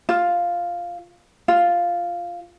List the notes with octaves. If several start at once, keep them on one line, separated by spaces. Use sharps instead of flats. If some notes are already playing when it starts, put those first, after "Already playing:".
F4
F4